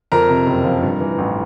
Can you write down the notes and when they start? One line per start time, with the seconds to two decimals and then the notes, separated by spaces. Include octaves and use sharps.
0.12 F2 A#4 A#5
0.29 C3
0.46 F#1
0.64 F3
0.82 G2
1.00 E3
1.18 A1